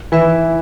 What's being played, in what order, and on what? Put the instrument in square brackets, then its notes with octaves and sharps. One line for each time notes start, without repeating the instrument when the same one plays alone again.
[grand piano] E3 [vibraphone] E4 B4 E5